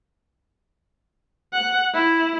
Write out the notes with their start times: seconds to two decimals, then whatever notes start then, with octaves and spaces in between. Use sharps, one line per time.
1.53 F#5
1.94 E4